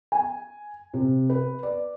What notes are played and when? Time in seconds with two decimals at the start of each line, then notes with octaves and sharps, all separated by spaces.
0.12 G#5
0.94 C3
1.30 B4
1.63 D5